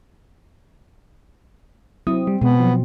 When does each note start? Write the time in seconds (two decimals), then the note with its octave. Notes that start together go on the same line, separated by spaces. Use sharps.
2.07 F#3 C4 E4 D#6
2.27 G3
2.42 B2 G#3 B3
2.59 F3 F#3